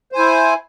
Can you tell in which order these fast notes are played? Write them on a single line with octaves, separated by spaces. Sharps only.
C5 G#5 E4